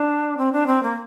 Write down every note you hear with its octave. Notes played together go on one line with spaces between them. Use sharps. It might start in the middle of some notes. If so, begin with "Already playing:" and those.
Already playing: D4
C4
D4
C4
A#3